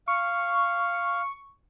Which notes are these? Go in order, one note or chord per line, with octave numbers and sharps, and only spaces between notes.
F5 C#6